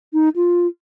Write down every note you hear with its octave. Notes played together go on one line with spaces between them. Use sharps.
D#4
F4